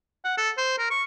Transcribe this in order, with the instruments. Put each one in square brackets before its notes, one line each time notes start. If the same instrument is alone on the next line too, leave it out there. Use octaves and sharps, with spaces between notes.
[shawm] F#5
A4
C5
A#4
C#6